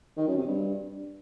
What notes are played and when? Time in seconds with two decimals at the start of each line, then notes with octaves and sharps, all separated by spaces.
0.17 D#3
0.27 F#2
0.37 C3
0.48 G2